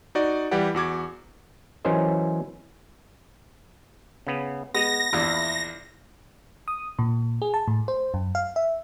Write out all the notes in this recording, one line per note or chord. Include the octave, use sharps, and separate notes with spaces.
D#4 F#4 D5
E3 G3 G4 D5 F#5
E2 F#4 D6 G#6
E3 F#3 C#4 A#4 C5 D#5
C#3 B3
G#3 B3 A#6
A#1 E2 E4 D5
D#6
A#2
G#4
A5
A2
C5
F#2
F5
E5